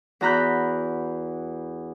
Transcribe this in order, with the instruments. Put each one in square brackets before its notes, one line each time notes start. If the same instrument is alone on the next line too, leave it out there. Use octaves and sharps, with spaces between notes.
[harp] E2 F#4 A#5 B5 F#6 G6